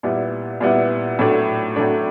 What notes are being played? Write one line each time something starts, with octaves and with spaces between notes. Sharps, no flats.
A#2 G3 B3 E4
A#2 G3 B3 E4
A2 F#3 A3 D4
A2 F#3 A3 D4